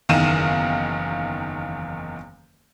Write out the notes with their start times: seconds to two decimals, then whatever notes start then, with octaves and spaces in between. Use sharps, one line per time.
0.09 F#1 E2 D#3 F5 D#7 E7